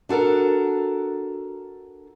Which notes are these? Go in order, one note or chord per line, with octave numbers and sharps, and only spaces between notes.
D4 F#4 A4 A#4